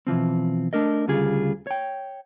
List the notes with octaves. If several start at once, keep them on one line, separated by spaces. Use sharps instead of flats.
B2 E3 F3 C4
A3 D4 A#4 D#5
D2 C#3 G3 F4 G#4
C#5 G5